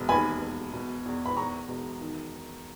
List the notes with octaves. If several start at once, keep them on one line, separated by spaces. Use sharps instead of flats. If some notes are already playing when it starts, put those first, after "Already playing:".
Already playing: E1
D#2 G#5 B5
E1
B2
E2
B5
E2 A#5 C#6
E1
D#3